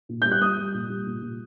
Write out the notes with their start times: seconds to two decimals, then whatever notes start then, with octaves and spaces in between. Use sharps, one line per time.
0.09 A#2
0.22 G3 G6
0.32 F#6
0.41 G3 D#6
0.57 G3
0.74 A#2
0.90 G3
1.06 A#2
1.22 A#2